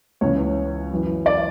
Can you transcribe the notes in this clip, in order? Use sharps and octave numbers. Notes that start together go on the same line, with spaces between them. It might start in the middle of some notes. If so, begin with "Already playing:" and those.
C#2 C#3 E3 C#5
F#2 E3
D5